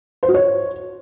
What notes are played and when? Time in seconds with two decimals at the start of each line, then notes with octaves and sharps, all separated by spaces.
0.23 C5
0.28 F#4
0.34 C#5